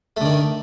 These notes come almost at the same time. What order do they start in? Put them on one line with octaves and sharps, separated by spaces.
A3 D3 D#3